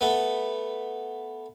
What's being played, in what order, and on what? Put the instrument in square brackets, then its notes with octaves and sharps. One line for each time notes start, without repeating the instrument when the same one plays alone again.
[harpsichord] A3 B3